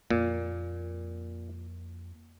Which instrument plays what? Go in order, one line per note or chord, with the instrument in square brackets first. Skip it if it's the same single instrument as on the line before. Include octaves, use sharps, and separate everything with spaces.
[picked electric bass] F2 A#3 [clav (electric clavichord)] A#2